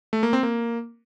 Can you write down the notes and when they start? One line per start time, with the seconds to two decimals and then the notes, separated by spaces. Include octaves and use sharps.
0.13 A3
0.23 A#3
0.33 C4
0.43 A#3